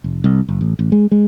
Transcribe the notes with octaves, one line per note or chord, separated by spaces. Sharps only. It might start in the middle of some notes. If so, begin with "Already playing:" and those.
F1
C2
F#1
A1
A1
G#3
G#3